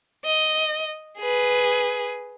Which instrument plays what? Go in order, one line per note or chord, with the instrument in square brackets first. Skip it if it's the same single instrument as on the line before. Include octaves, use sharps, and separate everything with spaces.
[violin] D#5
G#4 B4